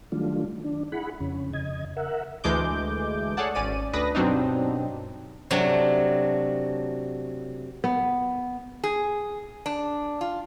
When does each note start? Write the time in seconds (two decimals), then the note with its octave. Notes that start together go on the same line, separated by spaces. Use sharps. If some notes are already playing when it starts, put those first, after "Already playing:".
0.12 D#3 F#3 G3 A3 D4 F4
0.64 D4
0.92 E4 G#4 F#5 B5
1.20 F2 C#3 C#4
1.53 F2 C#3 D#5 G#6
1.97 A#4 E5 F#5
2.44 D2 E3 G#3 A3 D6 G6
3.37 G#4 A4 C#5 D5 F#5 A5
3.55 G#1 C#4 D5 D#7
3.93 D2 D4 B4 D#6 A#6
4.15 G2 B2 F#3 C4 D4 D#4
5.51 C3 F#3 A3 D4
7.84 B3
8.84 G#4
9.66 D4
10.21 F4